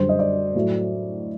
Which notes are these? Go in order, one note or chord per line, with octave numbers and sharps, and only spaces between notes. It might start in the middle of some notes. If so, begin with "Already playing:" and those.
Already playing: F#2 D3 G3 C5
D#5
D5
A2 F#3 A3